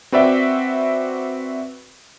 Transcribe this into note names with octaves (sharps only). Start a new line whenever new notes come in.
C4 F#4 B4 D5 E5 G5